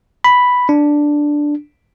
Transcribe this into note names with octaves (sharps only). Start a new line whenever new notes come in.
B5
D4